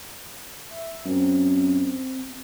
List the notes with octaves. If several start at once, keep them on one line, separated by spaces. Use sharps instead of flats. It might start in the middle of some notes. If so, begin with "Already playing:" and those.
E5
F#2 C4